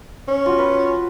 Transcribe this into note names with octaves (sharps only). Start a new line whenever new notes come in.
C#4
F4 F#4
B4